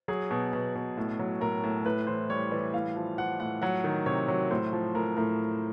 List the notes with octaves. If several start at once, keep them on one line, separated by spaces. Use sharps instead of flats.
F#3 G#4
B2
B2
B2
A2
F#3
A2 A#4
A2
A2 B4
E3 C5
G3 C#5
E3 D5
A2 F5
F3
F3 F#5
A2 F#5
F#3 F#5
D#3
C3 C#5
F#3
A2 C5
F3
A2 A#4
A2 A#4